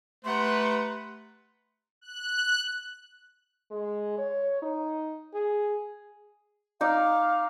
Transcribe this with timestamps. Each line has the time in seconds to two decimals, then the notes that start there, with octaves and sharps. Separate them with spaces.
0.24 A3 G4 B4 F#5 A#5 C6
2.01 F#6
3.71 G#3
4.18 C#5
4.62 D#4
5.34 G#4
6.81 D#4 D5 F5